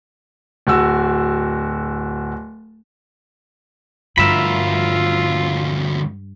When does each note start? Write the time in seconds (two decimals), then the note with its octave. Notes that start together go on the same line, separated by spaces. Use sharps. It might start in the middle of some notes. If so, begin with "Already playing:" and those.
0.67 D1 F#4 E6
4.18 D2 G2 F3 F4 A#4 E5 B5